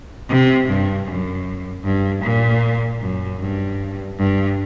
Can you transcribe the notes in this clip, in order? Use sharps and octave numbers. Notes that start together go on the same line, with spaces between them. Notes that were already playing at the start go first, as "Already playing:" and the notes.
C3
G2
F#2
G2
A#2
F#2
G2
G2